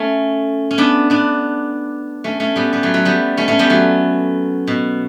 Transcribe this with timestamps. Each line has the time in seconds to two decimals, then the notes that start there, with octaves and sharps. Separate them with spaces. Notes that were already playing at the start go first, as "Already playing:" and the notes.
Already playing: A3 C#4
0.71 C#4
0.78 B3 D4
1.10 B3 D4
2.24 A3 C#4
2.40 A3 C#4
2.56 G3 B3
2.73 G3 B3
2.83 F#3 A3
2.94 F#3 A3
3.05 G3 B3
3.37 A3 C#4
3.48 A3 C#4
3.59 G3 B3
3.70 F#3 A3
4.68 B2